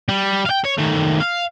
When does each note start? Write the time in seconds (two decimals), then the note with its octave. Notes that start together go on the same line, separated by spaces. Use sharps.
0.09 G3
0.45 F5 G5
0.64 C#5
0.78 D#3 A3
1.20 F5